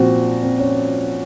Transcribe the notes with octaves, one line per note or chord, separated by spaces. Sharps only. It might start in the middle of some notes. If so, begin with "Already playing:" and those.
Already playing: A#2 F3 C4 F#4
C4
C#4